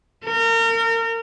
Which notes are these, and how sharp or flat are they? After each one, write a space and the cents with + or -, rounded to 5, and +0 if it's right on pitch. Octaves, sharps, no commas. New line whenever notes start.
A#4 -30